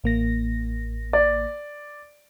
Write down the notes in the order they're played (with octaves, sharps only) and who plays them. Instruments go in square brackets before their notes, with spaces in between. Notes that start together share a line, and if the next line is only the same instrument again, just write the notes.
[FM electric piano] A1 A#3 A#6
[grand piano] D5